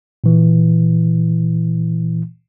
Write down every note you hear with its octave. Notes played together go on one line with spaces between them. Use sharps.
A#2 E3